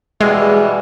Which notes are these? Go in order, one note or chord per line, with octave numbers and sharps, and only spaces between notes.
B2 E3 G3 G#3